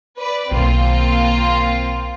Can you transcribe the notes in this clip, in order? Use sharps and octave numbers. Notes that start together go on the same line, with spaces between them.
B4 D5
B1 D#3 A#3 C4 F4